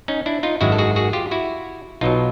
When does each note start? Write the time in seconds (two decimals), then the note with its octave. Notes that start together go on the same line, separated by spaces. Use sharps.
0.08 C#4 D#4
0.26 D4 E4
0.43 D#4 F4
0.61 G#1 F#2 D#3 G#3 E4 F#4
0.72 A4
0.78 F#4 G#4
0.96 F#4 G#4
1.13 F4 G4
1.31 E4 F#4
2.01 B1 B2 F#3 D#4 F4